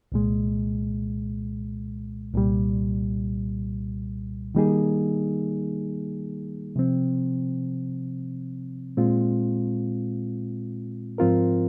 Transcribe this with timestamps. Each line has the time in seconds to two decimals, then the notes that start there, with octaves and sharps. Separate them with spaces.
0.12 C2 A#2 G#3
2.33 C2 A#2 G3
4.55 D#3 G3 A#3 D#4 G#4
6.76 C3 F3 C4
8.97 A#2 G#3 C4 F4
11.18 G#2 F3 C4 F4 A#4